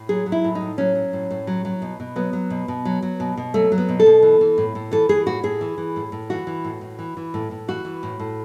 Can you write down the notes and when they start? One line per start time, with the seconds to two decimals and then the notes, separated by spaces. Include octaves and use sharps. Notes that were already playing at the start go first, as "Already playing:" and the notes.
Already playing: A2
0.09 F#3 G#4
0.26 F#3
0.32 E4
0.44 A2
0.55 D#4
0.61 A2
0.78 F#3 C#4
0.95 F#3
1.13 A2
1.31 A2
1.47 F#3
1.65 F#3
1.82 B2
2.00 B2
2.16 F#3 B3
2.33 F#3
2.50 B2
2.68 B2
2.85 F#3
3.03 F#3
3.20 B2
3.37 B2
3.54 F#3 A3
3.72 F#3
3.78 B3
3.89 B2
4.00 A4
4.06 B2
4.23 E3
4.41 E3
4.58 A2
4.75 A2
4.91 E3 A4
5.09 E3 G#4
5.26 A2 F#4
5.43 A2 G#4
5.61 E3
5.78 E3
5.96 A2
6.12 A2
6.30 E3 F#4
6.47 E3
6.65 A2
6.81 A2
6.99 E3
7.17 E3
7.34 A2
7.51 A2
7.68 E3 F#4
7.85 E3
8.03 A2
8.20 A2